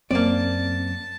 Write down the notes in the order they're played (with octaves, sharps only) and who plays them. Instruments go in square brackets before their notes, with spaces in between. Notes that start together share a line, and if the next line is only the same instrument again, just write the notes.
[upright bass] F#2 [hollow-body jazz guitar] A#3 D5 [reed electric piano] C4 [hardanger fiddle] A5